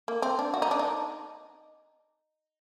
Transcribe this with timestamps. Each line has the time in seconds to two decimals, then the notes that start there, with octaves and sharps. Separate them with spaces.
0.08 A#3
0.22 C4
0.39 D4
0.54 F#4
0.62 D#4
0.71 D4
0.79 D#4